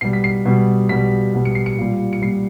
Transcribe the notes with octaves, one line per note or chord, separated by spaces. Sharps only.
B2 G3 C7
B6
C7
B2 G3
B2 G3 B6
B2 G3
C#7
C7
C#7
A#2 G3
C#7
A#2 G3 C7